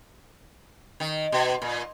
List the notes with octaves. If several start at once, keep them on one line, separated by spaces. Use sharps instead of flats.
D#3
B2
A#2